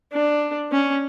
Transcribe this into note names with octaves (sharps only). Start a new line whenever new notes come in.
D4
C#4